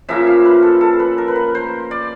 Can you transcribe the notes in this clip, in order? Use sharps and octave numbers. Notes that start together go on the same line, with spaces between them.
C#3 F3 A#3 E5
F5
B4
A4
A4
B4
A#4
B4
A#4
C5
D5